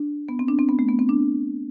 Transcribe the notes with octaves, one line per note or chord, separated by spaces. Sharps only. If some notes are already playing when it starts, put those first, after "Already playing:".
Already playing: D4
B3
C4
D4
C4
B3
A3
B3
C4
D4